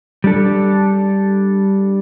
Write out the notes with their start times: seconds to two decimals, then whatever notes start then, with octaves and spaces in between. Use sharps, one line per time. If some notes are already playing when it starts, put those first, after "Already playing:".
0.24 G3 D4 A4